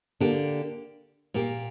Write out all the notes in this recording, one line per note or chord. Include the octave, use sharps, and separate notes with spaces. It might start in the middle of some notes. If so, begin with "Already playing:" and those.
D3 A#3 D4 G4
A#2 A#3 G4